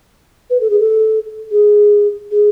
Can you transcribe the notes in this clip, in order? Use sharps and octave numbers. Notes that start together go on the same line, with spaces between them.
B4
A4
G#4
A4
G#4
G#4